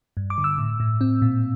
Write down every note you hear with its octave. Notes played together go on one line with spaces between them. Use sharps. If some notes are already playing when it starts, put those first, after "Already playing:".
G2
D6
D3
E6
A2
A2
C4
A#2